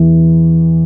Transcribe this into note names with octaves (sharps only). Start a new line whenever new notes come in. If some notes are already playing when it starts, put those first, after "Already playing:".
Already playing: E2 E3